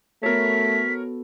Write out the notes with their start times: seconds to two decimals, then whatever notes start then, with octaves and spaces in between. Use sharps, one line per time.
0.23 A3 B3 F#4 A4 A#4 C#5 B6